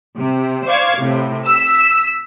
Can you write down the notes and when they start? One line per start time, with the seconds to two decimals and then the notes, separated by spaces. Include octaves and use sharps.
0.18 C3
0.66 C5 D5 F5 C#6 G#6
0.99 A2 C3
1.48 E6 B6